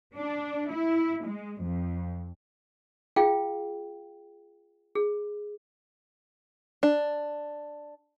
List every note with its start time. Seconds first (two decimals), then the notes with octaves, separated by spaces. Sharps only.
0.14 D4
0.71 E4
1.25 G#3
1.61 F2
3.16 F4 G#4 F5 G5
4.95 G#4
6.83 D4